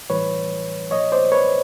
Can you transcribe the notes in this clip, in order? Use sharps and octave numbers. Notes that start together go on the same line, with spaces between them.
A2 E3 G3 B4 C#5
A#2 F3 C#5 D#5
C5 D5
B4 C#5